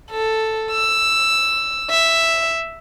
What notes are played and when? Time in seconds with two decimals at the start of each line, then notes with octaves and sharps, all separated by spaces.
0.11 A4
0.71 E6
1.90 E5